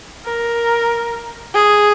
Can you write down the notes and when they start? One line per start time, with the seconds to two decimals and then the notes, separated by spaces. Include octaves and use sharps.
0.25 A#4
1.54 G#4